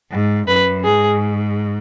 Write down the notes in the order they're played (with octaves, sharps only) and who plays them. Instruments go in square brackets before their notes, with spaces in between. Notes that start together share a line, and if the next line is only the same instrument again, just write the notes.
[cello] G#2
[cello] F#2 [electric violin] B4
[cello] G#2 [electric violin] G#4